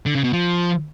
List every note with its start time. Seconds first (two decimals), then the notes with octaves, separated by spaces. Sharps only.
0.06 D3
0.15 C#3
0.24 B2
0.33 F3